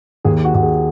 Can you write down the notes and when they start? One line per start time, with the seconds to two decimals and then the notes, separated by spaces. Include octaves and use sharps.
0.25 D#2 G#4
0.44 F#4
0.54 D#2 F#4
0.63 G#4